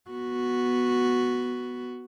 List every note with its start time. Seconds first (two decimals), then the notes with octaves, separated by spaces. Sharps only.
0.10 B3 F#4